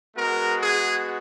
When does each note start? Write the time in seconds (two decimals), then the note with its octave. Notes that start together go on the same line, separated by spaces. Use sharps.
0.16 G#3 B3 F#4 A#4
0.58 G#4